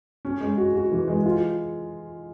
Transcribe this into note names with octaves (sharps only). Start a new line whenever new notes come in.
C#4
G#3
F#4
F#4
E3
G#3
F4